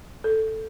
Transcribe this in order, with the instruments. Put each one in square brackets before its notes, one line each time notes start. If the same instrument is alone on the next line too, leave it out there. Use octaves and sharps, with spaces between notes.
[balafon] A4